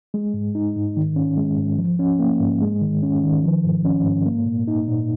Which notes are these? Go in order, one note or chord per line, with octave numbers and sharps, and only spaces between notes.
G#3
G#2
D#4
G#2
D#3
C#4
G#3
G#2
F3
C#4
A#3
G#2
G#3
D#3
C#4
D#3
F3
G#2
C#4
G#2
A#3
A#2
D#4
A#2